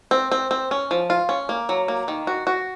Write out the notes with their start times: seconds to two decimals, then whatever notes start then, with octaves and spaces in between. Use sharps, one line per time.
0.11 C4
0.31 C4
0.51 C4
0.71 C#4
0.91 F3
1.10 F4
1.29 C#4
1.49 A#3
1.69 F#3
1.88 A#3
2.08 D#3
2.27 F#4
2.47 F#4